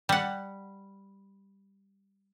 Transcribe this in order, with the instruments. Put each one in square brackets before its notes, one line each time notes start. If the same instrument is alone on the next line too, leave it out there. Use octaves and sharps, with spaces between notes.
[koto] G3 F#5